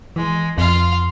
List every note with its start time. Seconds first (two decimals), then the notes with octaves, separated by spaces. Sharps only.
0.16 E3 G#3
0.58 F2 F4 F5